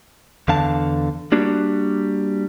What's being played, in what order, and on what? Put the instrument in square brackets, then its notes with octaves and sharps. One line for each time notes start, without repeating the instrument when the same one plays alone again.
[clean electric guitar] E2 D3 F5 A5
G3 A#3 D4 F#4